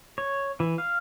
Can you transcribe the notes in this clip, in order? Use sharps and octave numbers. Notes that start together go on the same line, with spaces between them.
C#5
E3
F5